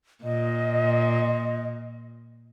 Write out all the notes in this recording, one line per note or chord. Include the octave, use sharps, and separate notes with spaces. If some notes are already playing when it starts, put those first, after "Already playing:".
A#2 D#5